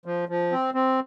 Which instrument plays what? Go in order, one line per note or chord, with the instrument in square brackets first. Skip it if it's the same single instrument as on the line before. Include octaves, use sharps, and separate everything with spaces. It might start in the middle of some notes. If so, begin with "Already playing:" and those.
[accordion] F3
F3
C4
C4